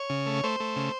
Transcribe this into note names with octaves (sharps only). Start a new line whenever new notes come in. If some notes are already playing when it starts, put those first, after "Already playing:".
Already playing: C#5
C#3
A3
A3 C5
A3
C#3